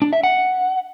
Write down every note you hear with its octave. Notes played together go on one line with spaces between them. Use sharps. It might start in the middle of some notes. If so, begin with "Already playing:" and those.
D4
E5
F#5